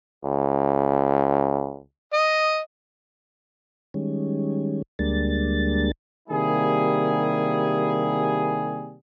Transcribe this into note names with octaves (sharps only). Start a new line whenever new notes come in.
C#2
D#5
D#3 G3 G#3 C#4
D2 G3 G#3 A#3 D4 A6
C3 D#3 G3 A#3 E4 G#4